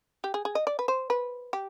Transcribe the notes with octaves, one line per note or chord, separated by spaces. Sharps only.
G4
G#4
G#4
D#5
D5
B4
C5
B4
G4